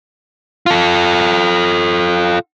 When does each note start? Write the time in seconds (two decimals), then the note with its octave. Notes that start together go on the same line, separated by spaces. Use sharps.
0.66 F4 A4